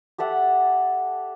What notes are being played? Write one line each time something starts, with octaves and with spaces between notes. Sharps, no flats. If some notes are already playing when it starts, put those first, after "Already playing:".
G4 A4 E5 F#5